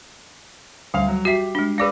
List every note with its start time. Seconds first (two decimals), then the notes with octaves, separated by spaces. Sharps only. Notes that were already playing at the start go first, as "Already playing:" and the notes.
0.94 D2 G3 F5 F7
1.08 F#3
1.25 F#4 G4 E5 B6 C7
1.55 G#3 D4
1.78 G#4 B4 D5 F5 D6 A#6